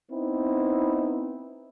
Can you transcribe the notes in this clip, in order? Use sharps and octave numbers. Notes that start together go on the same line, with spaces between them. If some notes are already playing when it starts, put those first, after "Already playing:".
B3 C4 D#4 E4